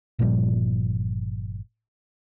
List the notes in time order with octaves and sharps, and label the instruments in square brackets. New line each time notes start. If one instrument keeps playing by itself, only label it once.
[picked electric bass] G1 A#2 F3 G3